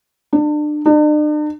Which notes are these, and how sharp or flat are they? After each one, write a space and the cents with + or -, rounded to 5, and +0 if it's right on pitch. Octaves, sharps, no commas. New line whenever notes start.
D4 +30
D4 +45